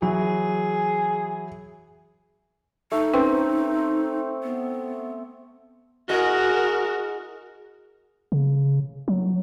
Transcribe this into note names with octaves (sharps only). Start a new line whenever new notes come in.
E3 F#3 G#4
A3 D#4
C4 C#4 B4 G5
B3
E4 F#4 G#4 A#4 D#5
C#3
F#3